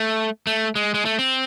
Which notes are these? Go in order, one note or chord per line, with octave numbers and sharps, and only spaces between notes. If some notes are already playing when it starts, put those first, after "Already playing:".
Already playing: A3
A3
G#3
G#3
A3
C4